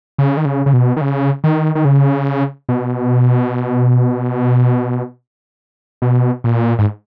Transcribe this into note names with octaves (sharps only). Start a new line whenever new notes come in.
C#3
D#3
C#3
C#3
B2
D#3
C#3
D#3
D#3
C#3
B2
B2
A#2
G#2